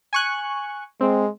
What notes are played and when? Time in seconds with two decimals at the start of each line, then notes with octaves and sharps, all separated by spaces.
0.13 G#5 C#6 F#6
1.01 G#3 C4